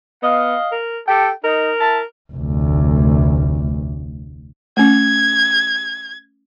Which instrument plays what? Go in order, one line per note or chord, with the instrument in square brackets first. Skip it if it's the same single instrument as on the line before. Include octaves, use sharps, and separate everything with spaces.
[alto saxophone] B3 [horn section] D#5 F5
[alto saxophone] A#4
[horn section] G4 A4 [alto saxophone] G5
[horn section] D#4 [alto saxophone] A#4
[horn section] E4 E5 A5
[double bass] F1 D2
[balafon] A3 C#4 [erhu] G#6